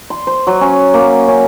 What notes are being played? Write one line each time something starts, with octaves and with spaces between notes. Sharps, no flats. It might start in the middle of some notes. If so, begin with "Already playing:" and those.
C6
C5
F#3
C#4
A#3
C#4